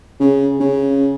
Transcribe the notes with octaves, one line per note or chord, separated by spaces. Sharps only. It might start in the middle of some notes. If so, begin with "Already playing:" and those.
C#3
C#3